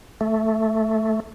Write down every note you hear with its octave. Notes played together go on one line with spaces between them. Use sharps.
A3